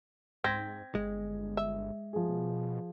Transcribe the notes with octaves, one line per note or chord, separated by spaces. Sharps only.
G#2 C4 G#6 A#6 B6
G1 G#3
E5
F3 G#4
B2